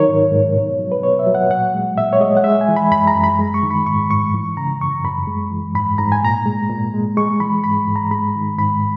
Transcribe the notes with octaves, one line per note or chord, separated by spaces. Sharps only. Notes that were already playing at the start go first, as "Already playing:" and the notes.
Already playing: D#3 F#3 D#4 A#4 C#5
G#2
G#2
B2
F#3
B4
B2 C#5
E5
F#3
F#5
A#2 F#5
G#3
A#2 E5
C#5
G#3 D#5
F#5
G#3 E5
G#5
E3
B5
F#2 B5
A#5
F#2
B5
G#3
C#6
D#3
B5
G#2 C#6
G#2 C#6
E3
C#3 A#5
F#2 C#6
F#2 B5
G#3
E3
G#2 B5
G#2 A#5
G#5
A#2 A#5
G#3
A#2
G#3
G#3 C#6
E3 B5
G#2 B5
G#2
A#5
G#3 B5
D#3
G#2 B5